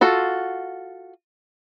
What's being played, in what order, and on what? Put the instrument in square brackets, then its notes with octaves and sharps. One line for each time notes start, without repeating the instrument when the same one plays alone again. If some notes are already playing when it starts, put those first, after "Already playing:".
[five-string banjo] F4 F#4 A4